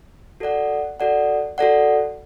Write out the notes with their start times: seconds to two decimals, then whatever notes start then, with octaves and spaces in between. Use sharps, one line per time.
0.40 F#4 A4 D5 F#5
1.00 F#4 A4 D5 F#5
1.58 F#4 A4 D5 F#5